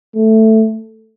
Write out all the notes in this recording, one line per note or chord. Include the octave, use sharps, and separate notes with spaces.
A3